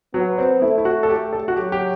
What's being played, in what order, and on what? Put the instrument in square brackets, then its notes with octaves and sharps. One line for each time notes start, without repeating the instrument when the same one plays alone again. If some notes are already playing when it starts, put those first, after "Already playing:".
[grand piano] F#3 [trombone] B3
[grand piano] C4
[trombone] A3 [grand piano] E4
[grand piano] E4
F#4
A4
G4
A4
F#4
[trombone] F#3 [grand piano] G4
[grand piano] G4